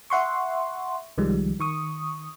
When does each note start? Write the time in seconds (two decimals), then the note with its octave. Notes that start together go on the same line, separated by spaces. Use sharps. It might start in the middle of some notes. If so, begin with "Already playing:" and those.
0.10 E5 F#5 C6 C#6
1.18 C2 D#3 F3 G3 G#3
1.60 D#3 C#6 D#6